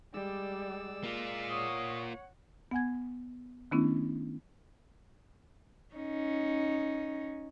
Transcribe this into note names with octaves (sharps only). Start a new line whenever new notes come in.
G3 G#3 D5 E6
A#3 F4
C#5 F#5 C#6 D#6
B3 F#5 G#5 G#6
D#3 A3 B3 C#4 D4 E4
C#4 D#4